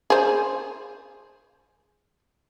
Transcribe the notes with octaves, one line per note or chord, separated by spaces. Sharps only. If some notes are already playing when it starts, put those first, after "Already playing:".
G#4 C5